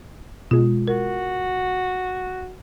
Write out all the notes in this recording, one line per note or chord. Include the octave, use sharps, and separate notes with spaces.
B2 G#3 F4
F#4 A#4